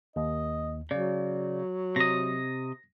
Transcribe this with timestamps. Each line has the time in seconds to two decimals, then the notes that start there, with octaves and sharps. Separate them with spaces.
0.16 D#2 D#5
0.91 C#3 F#3 D5
1.96 C3 D#5 A#6